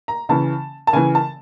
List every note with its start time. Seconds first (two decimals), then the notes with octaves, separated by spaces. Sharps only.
0.08 A#5
0.29 C#3 E3 A5
0.87 A5
0.93 C#3 E3 G#5
1.15 A5